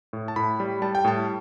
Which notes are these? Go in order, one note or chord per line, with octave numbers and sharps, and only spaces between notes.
A2
A5
A2 B5
G3
G3 A5
G5
A2 A5